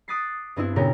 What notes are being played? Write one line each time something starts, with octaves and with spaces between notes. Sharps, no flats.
D6 D#6 F#6 A6 B6 C7
G2 B3 C4 D4 E4
A#2 C#3 B3 G4 A#4